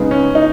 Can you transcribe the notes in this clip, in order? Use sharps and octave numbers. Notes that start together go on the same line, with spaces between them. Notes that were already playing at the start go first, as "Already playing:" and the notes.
Already playing: C#3 G#3 B3 D#4
C#4
D#4